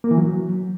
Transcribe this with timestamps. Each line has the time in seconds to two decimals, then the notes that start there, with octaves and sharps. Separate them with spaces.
0.04 A#3
0.11 E3
0.18 F#3